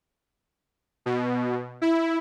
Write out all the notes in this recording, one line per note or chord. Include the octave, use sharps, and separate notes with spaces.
B2
E4